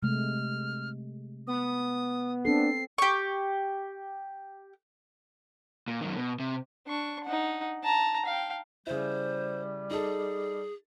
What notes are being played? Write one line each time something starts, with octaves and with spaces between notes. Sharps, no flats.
C3 G#3 A3 F6
B3 D#6
C4 D4 A4 C7
G4 C#6
A#2
F#2 D#3
B2
C3
D4 C#6
D#4 F#5
A5 A#5
F5 G5
C#3 G3 E4 C5
D#4 G#4 A4